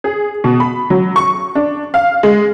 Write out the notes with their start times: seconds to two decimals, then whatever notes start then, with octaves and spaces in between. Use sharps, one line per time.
0.04 G#4
0.44 B2
0.60 B5
0.90 F#3
1.16 C#6
1.55 D4
1.94 F5
2.23 G#3